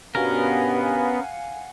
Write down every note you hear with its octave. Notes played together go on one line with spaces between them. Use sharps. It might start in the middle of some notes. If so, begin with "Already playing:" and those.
G2 B2 B3 C#4 A#4 F5 F#5 G#5